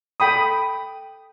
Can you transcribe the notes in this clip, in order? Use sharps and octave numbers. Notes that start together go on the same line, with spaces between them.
A4 G5 B5 D#6